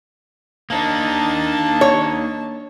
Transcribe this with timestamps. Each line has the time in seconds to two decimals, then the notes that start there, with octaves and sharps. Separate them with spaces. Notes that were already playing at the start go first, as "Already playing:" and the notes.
0.70 A#3 D4 D#4 A5
1.81 C#5